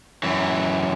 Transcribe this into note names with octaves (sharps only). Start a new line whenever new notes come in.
F#2 E3